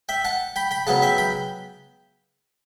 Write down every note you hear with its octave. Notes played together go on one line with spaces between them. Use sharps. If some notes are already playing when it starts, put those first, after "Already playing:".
E5 G5
F#5 A5
G5 B5
G5 B5
C#3 F#3 B3 F#5 A5
E5 G5
G5 B5